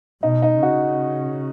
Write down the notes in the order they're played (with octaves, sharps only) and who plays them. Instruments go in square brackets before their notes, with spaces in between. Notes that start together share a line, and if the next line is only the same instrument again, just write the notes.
[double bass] B2 [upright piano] D#4
[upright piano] D#4
[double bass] C#3 [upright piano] F#4